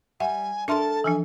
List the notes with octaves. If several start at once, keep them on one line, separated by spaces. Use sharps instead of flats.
G3 E5 F#5 G#5
D4 A4 A#4 E5 A5 C6
E3 F3 D4 G#5